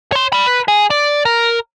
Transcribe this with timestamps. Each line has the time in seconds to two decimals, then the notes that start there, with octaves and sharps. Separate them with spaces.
0.12 C#5 C6
0.33 D5 B5
0.46 B4
0.68 G#4
0.90 D5
1.25 A#4